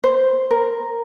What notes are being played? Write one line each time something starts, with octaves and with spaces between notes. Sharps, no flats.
C5
A#4